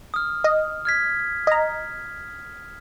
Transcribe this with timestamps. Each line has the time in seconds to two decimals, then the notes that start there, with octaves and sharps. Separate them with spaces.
0.14 D#6 F6
0.44 D#5
0.85 F6 G#6 B6
1.47 D#5 A#5